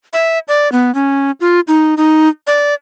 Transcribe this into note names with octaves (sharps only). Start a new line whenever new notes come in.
E5
D5
B3
C#4
F4
D#4
D#4
D5